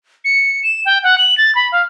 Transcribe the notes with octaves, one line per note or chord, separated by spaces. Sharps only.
C#7
E7
G5
F#5
F#7
A6
B5
F5